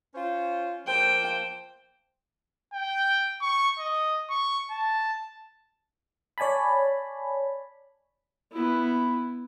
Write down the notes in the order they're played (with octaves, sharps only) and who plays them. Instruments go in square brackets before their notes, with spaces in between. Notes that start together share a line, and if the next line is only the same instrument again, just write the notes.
[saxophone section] C#4 F4 C5
[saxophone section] F3 A#3 C5 [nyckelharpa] G5
[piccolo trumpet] G5
C#6
D#5
C#6
A5
[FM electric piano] C#5 D5 G#5 A5 B5
[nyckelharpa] B3 E4